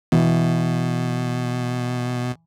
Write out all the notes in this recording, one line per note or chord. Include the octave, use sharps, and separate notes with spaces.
B2 E3